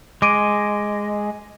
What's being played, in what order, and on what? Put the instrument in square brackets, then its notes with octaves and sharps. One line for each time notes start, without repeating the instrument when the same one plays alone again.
[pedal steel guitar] G#3 [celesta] D6 D7 D#7